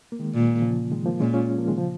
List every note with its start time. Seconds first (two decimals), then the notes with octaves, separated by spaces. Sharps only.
0.12 A#3
0.19 D#3 G#3
0.34 A#2
0.62 C#3 F3
0.91 D#3 G#3
1.06 F3 A#3
1.20 A#2 G#3 C#4
1.34 C#4 F4
1.58 F3 A#3
1.68 D#3 G#3
1.77 C#3 F3